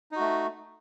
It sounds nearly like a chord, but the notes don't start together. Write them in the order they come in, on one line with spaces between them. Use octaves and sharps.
D#4 F#4 A3